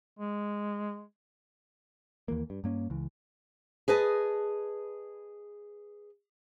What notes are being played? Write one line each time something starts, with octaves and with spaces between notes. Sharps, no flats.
G#3
D#2 E3 A#3
G2
G2 A#3 C#4
C#2 E3
G#4 B4 D#5 A5